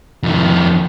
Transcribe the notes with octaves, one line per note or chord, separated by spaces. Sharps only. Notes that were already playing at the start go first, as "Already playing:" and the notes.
F2 D#3